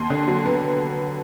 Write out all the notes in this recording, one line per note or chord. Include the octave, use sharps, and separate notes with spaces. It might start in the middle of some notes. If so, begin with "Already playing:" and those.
Already playing: D#2 C6
D3
F#3
B3